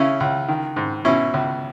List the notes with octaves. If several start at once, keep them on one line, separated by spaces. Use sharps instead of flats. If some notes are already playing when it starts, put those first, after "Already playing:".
Already playing: C#3 C#4 E4
C#2
D#3
G#2
B2 C#4 E4
C#2